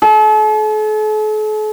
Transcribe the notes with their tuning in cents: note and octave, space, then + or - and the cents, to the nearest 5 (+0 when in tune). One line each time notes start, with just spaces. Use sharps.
A4 -45